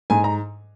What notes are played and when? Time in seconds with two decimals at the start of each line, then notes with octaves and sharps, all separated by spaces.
0.10 G#2 G#5
0.24 A#5